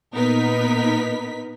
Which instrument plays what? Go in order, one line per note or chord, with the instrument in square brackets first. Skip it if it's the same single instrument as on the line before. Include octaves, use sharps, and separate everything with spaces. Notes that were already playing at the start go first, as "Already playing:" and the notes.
[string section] A#2 B3 D#4 A#4 B4 B6